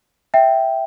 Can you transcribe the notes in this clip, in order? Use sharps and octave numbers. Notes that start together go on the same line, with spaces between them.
E5 G5